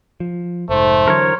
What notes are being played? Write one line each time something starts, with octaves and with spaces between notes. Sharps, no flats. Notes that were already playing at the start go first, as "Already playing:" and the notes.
F3
F1 G#2 A3 C5
D3 E3 F#3 A#4 C#5